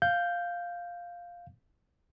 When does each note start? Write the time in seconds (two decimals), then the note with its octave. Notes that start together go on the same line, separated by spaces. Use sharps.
0.02 F5 G6